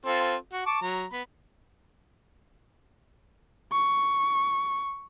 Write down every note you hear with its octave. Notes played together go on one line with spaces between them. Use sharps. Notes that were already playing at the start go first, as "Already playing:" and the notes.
C4 F4 A4
F#4
A5 C#6 D6
F#3 A#5
B3 B5
C#6